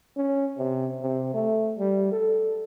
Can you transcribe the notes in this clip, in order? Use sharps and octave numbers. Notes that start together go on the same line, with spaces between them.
C#4
C3
C3
A3
G3
A4